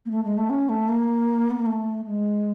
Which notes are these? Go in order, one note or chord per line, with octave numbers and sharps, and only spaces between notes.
A#3
A3
G#3
A3
C#4
A3
A#3
B3
A#3
A3
G#3